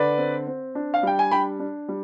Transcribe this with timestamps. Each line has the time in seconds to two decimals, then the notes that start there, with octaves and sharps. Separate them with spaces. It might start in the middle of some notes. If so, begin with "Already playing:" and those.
Already playing: D3 B4 D5
0.18 C4
0.47 C4
0.75 D4
0.94 F5
1.03 G3 G5
1.19 G#5
1.31 D4 G5 B5
1.60 D4
1.88 G3